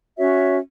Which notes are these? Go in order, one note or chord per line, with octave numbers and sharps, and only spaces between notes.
C#4 F#4 C#5 E5